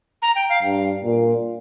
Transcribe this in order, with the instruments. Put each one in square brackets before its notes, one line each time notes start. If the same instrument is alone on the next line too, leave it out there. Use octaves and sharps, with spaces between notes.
[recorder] A#5
G5
F5
[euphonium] G2
A#2